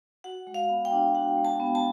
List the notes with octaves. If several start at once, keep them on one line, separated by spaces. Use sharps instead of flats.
F#4 F#5
G#3
F5
B3
G5
D4
F#4 F#5
G#3
A5
B3
A5